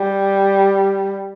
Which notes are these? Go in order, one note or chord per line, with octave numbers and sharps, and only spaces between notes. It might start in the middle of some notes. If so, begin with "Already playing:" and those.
Already playing: G3